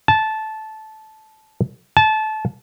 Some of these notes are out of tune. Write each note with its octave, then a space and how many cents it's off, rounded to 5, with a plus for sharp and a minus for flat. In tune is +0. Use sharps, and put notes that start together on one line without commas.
A5 -15
A5 -25